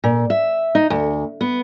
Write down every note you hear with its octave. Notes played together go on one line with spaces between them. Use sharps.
A#2
E5
D#4
D2
B3